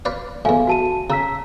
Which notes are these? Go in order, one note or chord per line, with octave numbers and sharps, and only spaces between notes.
B4 D5 F5
E2 A2 F5 G#5
F#4 A5 D#7
C#3 A#5 E6 B6